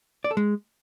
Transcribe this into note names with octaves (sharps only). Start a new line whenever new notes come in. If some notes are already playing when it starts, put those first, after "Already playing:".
D5
A4
G#3